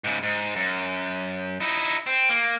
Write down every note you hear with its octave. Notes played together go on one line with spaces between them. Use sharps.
G#2 C#3
G#2
F#2
D#4 E4
C4
A#3